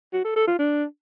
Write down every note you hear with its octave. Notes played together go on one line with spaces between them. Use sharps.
F#4
A4
A4
F4
D4